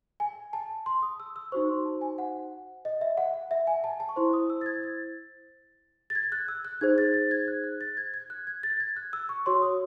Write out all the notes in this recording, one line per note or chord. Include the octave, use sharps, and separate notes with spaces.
G#5
A5
C6
D#6
E6
E6
D#4 F#4 C5 C#6
C6
A5
G#5
F#5
D#5
E5
F#5
F#5
E5
G#5
A5
A5
C#6
E4 C5 C6
D#6
E6
A6
G#6
A6
A6
G#6
F#6
E6
F#6
D#4 G#4 C5 G#6
A6
A6
G#6
F#6
F#6
A6
G#6
G#6
F#6
G#6
A6
G#6
F#6
E6
C#6
F#4 C#5 C6
D#6